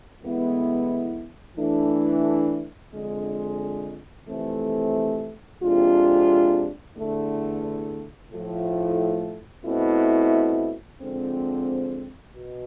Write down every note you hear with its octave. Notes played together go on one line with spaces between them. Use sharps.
A2 E3 G#3 B3 E4
E3 A3 D4
F2 D3 G#3
F2 C3 E3 A3 C4
F2 C3 G#3 D4 F4
E2 D3 A3
A2 F3 A3
B2 A3 C4 E4
D3 F3 G#3 C4
B2